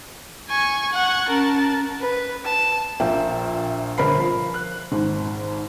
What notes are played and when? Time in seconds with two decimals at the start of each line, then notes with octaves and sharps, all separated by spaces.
0.50 G#5 C#6
0.93 F#5 C#6
1.29 C#4 A#4 A5
2.00 B4
2.45 A5
3.00 A#1 A#2 A#3 E5 G5
3.98 G1 A#4 C5 B5 C7
4.18 F3
4.54 F#6
4.92 G#1 G#2